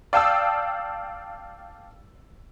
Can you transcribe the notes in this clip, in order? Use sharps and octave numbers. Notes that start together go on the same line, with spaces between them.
D5 F5 G5 A5 D#6 E6